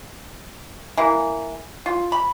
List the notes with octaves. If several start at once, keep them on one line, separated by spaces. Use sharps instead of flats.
E3 A#3
F4
B5